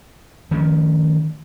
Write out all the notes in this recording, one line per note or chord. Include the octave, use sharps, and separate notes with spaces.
D#3 F3 A3 C#4